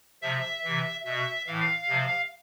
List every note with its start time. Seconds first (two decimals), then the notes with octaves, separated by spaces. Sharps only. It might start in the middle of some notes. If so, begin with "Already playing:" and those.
0.22 C3 F3 E5
0.64 C3 E3
1.05 B2 E5
1.47 A2 E3 F5
1.88 C3 F3